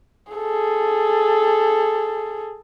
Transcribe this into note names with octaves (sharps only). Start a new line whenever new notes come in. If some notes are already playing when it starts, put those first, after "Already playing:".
G#4 A4